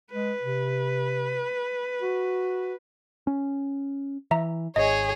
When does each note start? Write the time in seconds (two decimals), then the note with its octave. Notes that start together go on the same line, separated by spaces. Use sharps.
0.12 G#3 B4
0.42 C3
2.02 F#4
3.27 C#4
4.31 E3 E5 A#5
4.76 G#1 G#4 C#5 D#5